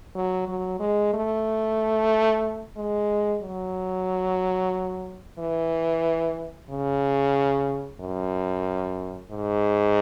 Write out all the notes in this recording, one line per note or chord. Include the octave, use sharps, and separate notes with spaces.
F#3
F#3
G#3
A3
G#3
F#3
E3
C#3
F#2
G#2